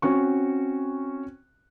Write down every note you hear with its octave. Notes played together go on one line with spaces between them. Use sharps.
C4 C#4 F#4 C#6